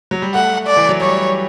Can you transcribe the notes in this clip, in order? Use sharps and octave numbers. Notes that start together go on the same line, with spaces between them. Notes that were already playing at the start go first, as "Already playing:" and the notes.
F#3
G3
A3 F#5
D5
E3
F#3
G3 C#5